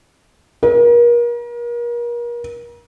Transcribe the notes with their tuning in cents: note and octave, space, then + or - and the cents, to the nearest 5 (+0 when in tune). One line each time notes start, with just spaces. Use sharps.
A#4 +35